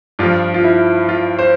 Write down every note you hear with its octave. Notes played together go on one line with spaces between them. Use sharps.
G2 F3 F4
F4
E4
F4
C5